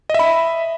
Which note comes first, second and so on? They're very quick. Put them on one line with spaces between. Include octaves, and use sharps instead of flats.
D#5 E5 B5